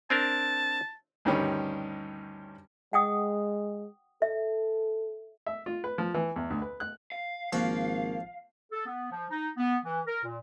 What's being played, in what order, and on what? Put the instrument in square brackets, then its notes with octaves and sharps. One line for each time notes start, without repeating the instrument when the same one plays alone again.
[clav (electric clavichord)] C4 D4 A#4 [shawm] A5
[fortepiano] D2 G2 D#3 G3 C#4
[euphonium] G#3 [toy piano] F#5 G5 D#6
[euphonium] A4 [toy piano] E5
[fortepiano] E5
F4
B4
F3
E3
E2
D2
B4
F#6
[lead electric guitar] F5
[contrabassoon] G#1 [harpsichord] F3 F#4 [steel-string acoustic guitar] A#3
[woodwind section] A4
B3
F3
D#4
B3
E3
A#4
A#2